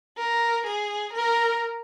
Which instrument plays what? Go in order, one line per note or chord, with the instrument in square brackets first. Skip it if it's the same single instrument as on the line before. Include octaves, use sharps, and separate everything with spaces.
[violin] A#4
G#4
A#4